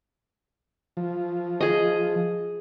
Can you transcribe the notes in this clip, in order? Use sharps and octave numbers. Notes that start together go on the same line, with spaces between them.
F3
G#4 D#5